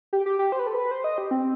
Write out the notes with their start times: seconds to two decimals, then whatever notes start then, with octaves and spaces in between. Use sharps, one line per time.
0.13 G4
0.26 G4
0.39 G4
0.52 C5
0.59 B4
0.67 A4
0.75 B4
0.91 C5
1.04 D#5
1.18 G4
1.31 C4